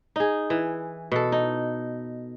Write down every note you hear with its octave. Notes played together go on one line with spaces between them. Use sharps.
D#4 G#4
E3
B2 A4
D#4